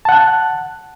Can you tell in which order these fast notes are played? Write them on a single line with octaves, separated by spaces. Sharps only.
A5 F#5 F#6